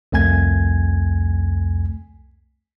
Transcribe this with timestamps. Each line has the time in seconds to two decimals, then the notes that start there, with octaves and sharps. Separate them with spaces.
0.12 C2 F2 A3 G#5 G#6